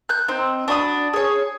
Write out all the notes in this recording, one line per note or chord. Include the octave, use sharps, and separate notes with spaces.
F#6 G6
C4 D#4
D4 F#4 B5 D#6
G#4 C#5